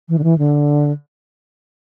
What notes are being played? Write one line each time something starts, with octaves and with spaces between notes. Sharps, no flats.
E3
D3
E3
D3